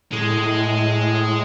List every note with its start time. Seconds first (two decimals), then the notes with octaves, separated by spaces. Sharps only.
0.13 A2 G#3 G#4